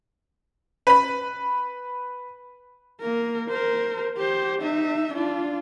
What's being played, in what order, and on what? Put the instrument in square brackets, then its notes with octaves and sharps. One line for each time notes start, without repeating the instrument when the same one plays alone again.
[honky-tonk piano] B4 B5
[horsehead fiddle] A#3 A#4
A#4 C5
G4 C5
D#4 E5
D4 F4